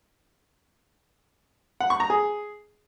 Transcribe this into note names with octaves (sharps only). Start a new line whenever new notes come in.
F#5
C#6
A#5
G#4